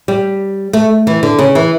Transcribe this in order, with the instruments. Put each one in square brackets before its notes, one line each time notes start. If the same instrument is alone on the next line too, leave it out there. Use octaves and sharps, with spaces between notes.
[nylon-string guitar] G3
A3
E3
D3
C#3
E3